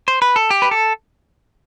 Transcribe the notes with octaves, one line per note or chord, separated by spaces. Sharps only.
C5
B4
A4
G4
B4
A4